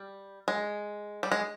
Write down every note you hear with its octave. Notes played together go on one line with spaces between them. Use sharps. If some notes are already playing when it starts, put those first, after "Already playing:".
Already playing: G3
G#3
G3
G#3